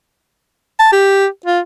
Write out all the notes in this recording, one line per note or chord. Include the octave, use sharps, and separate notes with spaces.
A5
G4
F4